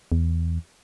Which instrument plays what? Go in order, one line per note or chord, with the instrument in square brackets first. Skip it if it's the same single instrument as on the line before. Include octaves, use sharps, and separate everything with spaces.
[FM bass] E2